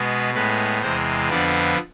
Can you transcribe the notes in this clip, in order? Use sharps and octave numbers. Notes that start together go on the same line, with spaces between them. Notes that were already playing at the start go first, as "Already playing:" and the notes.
Already playing: B2 G#3 B3
A2 G#3 B3 B4
E2 C3 G#3 C5
F2 D3 F3 B3 D5